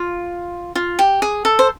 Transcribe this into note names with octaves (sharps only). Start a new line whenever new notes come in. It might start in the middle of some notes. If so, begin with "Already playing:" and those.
Already playing: F4
F4
G4
G#4
A4
C5